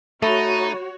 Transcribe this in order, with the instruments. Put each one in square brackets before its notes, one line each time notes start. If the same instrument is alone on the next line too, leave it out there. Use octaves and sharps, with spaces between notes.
[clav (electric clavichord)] A3 [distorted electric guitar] D#4 [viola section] F#4 C#5 [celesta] B5 A6 D#7